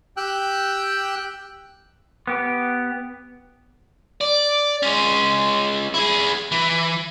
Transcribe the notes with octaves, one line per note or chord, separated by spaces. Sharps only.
G4 G5 E6 F#6
B3 G4
D5
G#3 C#4
E4 G#4
E3